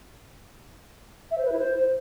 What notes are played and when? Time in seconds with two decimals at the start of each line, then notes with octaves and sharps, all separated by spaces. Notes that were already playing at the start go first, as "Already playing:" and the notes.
1.31 E5
1.38 C5
1.45 B4
1.52 E4
1.59 C5